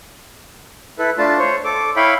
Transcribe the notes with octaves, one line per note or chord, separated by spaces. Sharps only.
E4 A4 B4
A3 D4 F4 A5
C5 C#5
A4 D6
E4 C#5 E5 F5 G5 B5